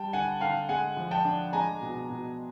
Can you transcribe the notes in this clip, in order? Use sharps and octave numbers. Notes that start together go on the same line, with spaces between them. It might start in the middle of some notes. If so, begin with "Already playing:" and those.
Already playing: G3 G5 A5
D3 F#5 G#5
D3 F5 G5
G#3 F#5 G#5
F3
G5 A5
D4
G#3 G#5 A#5
B2
B2